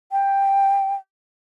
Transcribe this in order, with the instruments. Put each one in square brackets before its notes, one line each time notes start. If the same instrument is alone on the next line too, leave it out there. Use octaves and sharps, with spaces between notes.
[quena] G5